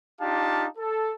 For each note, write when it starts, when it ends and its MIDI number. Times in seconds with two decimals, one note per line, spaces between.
0.21 0.66 62
0.21 0.66 63
0.21 0.66 65
0.21 0.66 67
0.21 0.66 77
0.21 0.66 81
0.78 1.13 69